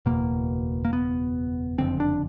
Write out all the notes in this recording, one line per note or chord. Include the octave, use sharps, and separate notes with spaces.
F#1 E2 B2 A#3
A#3
B3
F#1 F2 D3 C4
D4